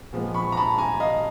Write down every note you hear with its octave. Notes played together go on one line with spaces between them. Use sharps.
A#2 F3 G#3 B3
B5 C#6
A#5
A5 B5
G#5 A#5
D#5 F5